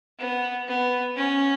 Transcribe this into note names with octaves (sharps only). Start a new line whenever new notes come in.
B3
B3
C#4